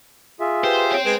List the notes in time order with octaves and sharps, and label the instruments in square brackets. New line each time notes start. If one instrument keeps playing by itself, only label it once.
[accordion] F4 G#4 E5
[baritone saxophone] G4 [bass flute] B4 [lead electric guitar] C5
[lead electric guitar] C5 G5 [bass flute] C#5
[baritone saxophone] G#3 [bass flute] B4